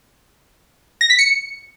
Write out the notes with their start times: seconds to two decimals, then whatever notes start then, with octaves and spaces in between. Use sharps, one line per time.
1.01 A#6
1.10 B6
1.19 C#7